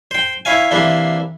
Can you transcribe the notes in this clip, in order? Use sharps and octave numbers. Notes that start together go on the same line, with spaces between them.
C5 G5
E4 C#5 F5 G#5
C3 E3 A#3 D4